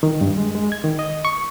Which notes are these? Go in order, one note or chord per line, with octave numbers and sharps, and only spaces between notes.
D#3
G2
G#3
G#3
G#6
D#3
D#5
C#6